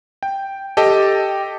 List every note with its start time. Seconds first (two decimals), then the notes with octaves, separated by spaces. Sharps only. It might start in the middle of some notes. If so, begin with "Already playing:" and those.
0.23 G5
0.77 G4 A4 D#5 G5 A5